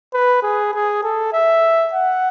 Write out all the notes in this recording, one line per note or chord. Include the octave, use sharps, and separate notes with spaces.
B4
G#4
G#4
A4
E5
F#5